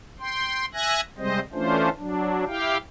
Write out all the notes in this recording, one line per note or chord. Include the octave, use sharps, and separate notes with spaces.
G5 C6
E5 G#5 F#6 G#6 A#6
C3 G3 G#3 C4 C5 D#5
E3 A3 C#4 D4 F4 C5
F#3 D4
E4 G4 F5 G5